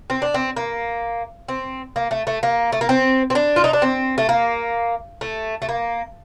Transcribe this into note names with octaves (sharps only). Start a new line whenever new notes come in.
C4
D4
C4
A#3
C4
A#3
A3
A3
A#3
A3
A#3
C4
C4
D4
F4
D#4
D4
C4
A3
A#3
A3
A3
A#3